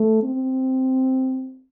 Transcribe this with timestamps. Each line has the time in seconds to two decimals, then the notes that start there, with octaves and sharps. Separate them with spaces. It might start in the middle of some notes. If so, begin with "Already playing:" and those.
Already playing: A3
0.23 C4